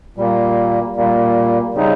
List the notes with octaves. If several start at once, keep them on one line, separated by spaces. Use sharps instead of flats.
A#2 G3 A#3
A#2 G3 A#3
C#3 G3 C4 D#4